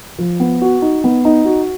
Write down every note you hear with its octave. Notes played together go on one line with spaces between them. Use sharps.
F3
B3
F#4
D#4
B3
D#4
F#4